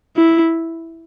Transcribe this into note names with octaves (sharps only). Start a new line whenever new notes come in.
E4